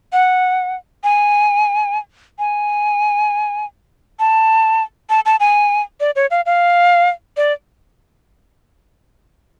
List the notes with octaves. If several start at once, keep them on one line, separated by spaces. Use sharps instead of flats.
F#5
G#5
G#5
A5
A5
A5
G#5
D5
C#5
F5
F5
D5